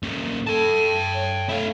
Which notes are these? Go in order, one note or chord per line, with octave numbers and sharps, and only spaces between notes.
A#2 C#4
A4 G5 A5
C#5
A3 E4 F5